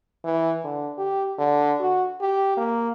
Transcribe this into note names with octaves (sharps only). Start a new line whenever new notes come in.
E3
D3
G4
D3
F#4
G4
A#3